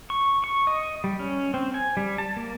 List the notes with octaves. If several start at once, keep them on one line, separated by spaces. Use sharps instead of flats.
C#6
C#6
D#5
G3
C#4
C4
G#5
G3
A5
A#3